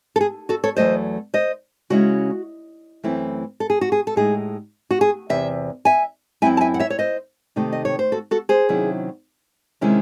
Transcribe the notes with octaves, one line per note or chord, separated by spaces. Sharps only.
A4
G#4
F#4 A4
A4 C#5
E2 C3 F#3 A3 C5 D#5
C5 D#5
C#3 G#3 C#4 E4 F#4
F#2 E3 A3 C4 E4
A4
G#4
F#4
G#4
A4
A2 G#3 D#4 G#4
F#4
G#4
E2 C3 E5
E5 G#5
F#2 E3 C4 E4 E5 G#5
A5
E5 G#5
F#5
C#5 E5
C#5
C5 D#5
C3 D#3 A3 D#4
D#5
C#5
C5
F#4 A4
F#4 A4
G#4 C5
C3 D#3 F#3 C#4 E4
C3 D#3 G#3 C#4 E4